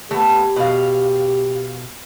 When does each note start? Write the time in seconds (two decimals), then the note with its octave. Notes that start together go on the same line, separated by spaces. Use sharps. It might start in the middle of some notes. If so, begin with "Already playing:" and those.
0.11 A3 B3 G4
0.56 B2 F5